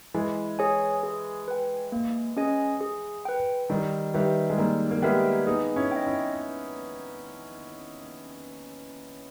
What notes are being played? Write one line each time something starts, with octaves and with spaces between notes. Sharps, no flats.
E3 G#3 E4
G#4 C#5 G#5
G#4
B4 G5
A#3
C#4 G#4 D#5 G#5
G#4
B4 G5
D#3 G3 D#4
D#3 G3 G4 B4 E5
G#3
G3 A#3 D#4
A#3
G#3 B3 G4 A#4 E5 G5
B3 D#4 G#4
C#4 E4
D#5 G5
C#4 E4